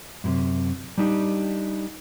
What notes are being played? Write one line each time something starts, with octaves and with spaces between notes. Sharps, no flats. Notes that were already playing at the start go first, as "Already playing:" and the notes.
F#2 A2 C3
G3 D4 D#4 G4